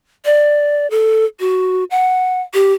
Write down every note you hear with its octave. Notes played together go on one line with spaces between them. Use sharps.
D5
A4
F#4
F#5
G4